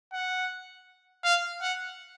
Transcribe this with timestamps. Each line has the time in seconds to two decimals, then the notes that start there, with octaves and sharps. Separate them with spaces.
0.13 F#5
1.24 F5
1.62 F#5